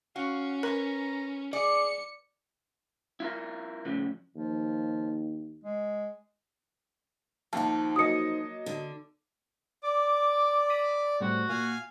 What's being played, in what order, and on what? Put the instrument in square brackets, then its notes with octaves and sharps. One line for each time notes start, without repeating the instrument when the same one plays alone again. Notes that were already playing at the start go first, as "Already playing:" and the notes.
[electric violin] C#4 [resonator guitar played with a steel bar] F#4 [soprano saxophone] F5
[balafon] A#4 [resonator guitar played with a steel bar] B4 [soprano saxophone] A#5
[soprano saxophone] G#4 [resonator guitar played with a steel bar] D5 [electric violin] C#7
[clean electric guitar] E4 F4 A#4
A2 C#3 F3
[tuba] D#2 [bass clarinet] F3
[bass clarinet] G#3
[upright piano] D#2 [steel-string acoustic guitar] F3 D#4 [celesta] A5
[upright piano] F#3 A#3 D#5 [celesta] D#6 C#7
[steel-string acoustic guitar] D3
[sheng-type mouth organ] D5 [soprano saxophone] D6
[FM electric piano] B5 D#6 E6
[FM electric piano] A2 G3 C4 [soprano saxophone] F#4
[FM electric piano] A#2 [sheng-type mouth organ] F5 G#5